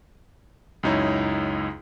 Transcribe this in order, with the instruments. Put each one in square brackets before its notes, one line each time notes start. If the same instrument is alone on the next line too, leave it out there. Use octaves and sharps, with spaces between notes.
[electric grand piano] C#2 F#2 D#4 E4 C#5